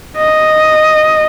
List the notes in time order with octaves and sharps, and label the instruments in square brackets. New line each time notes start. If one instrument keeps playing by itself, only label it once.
[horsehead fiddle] D#5